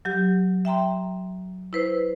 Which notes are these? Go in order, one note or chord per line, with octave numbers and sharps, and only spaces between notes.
F#3 G4
E5 G5 A#5 C6
E4 B4 C5